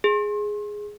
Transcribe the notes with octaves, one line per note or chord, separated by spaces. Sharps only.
G#4